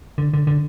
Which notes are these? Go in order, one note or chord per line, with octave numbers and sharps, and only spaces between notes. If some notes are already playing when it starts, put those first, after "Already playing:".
D3
D3
D3